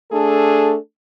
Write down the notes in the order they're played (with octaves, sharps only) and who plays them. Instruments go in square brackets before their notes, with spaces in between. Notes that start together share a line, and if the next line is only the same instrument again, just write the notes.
[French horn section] A3 D4 G#4 A4